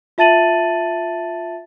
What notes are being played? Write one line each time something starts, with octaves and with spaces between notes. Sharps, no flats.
F4 E5 A5 A6 D#7 F#7